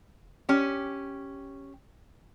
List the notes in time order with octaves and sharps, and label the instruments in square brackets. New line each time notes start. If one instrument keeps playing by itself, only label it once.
[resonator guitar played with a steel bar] C#4 G4